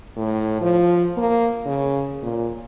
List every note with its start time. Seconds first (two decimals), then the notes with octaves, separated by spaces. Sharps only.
0.16 A2
0.61 F3
1.17 A#3
1.66 C#3
2.23 A#2